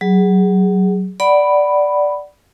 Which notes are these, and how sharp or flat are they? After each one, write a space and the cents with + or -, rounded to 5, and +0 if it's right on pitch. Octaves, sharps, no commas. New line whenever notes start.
F#3 +20 G#4 -15
D5 +0 F#5 +20 B5 +0